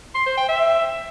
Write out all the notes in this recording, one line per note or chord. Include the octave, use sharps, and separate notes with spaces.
C6
C5
G5
E5